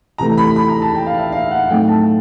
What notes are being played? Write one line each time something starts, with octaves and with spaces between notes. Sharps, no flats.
C3 E3 A3 A#5
B5
B5
A#5
A5
G5
F5
E5
F5
F#5
A2 F#3 A3 C4 D#4 G5
A5